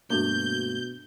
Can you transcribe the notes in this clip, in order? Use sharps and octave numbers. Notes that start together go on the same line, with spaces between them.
G2 B2 A3 A#3 D4 F#4 G6